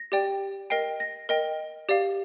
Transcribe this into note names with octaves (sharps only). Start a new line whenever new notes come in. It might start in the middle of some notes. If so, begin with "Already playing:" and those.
Already playing: A#6
G4 D5 G5
A#4 D#5 G5 C7
A#6
A#4 D#5 G5
G4 D5 F5